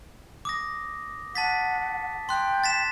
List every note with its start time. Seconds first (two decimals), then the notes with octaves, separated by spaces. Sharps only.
0.45 D6 D#6 A#6
1.35 F#5 A5 A6 B6
2.29 G5 C6 F#6
2.64 A6 B6 E7